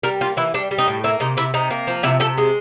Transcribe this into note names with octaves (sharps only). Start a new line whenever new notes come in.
G3 A#4
A#3 F4
E3 E4
G3 D4
G3
D#4
A2
A#3 E4
C3 D#4
C3 E4
C3 D#4
A#3
F3
C3 E4
C3 A4
G#3